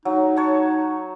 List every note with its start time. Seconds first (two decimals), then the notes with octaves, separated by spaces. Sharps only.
0.05 F#3 D#4
0.37 C#5 F#5 A5